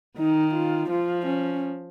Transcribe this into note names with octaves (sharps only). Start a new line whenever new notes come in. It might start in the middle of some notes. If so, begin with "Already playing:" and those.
D#3 D#4
F4
F3 F4
C#4